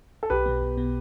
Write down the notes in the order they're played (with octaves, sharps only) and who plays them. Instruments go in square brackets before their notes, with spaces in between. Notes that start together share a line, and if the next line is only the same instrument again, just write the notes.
[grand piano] A4
[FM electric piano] B1 [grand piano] G4 B4
[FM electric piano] B2 B3
B1
B2 B3